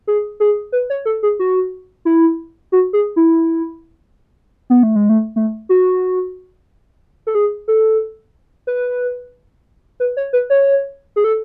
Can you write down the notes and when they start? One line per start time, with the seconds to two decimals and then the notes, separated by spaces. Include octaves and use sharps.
0.07 G#4
0.40 G#4
0.72 B4
0.90 C#5
1.06 A4
1.23 G#4
1.39 F#4
2.05 E4
2.72 F#4
2.93 G#4
3.16 E4
4.70 B3
4.83 A3
4.96 G#3
5.09 A3
5.36 A3
5.69 F#4
7.27 A4
7.35 G#4
7.68 A4
8.67 B4
10.00 B4
10.17 C#5
10.33 B4
10.50 C#5
11.16 G#4
11.24 A4